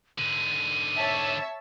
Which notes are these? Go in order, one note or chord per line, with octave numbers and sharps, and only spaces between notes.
G#2 D3 D#7
C#5 E5 A5